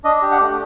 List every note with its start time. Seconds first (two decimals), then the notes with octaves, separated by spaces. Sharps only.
0.04 D4 D#5
0.22 G4
0.32 F#5
0.41 A3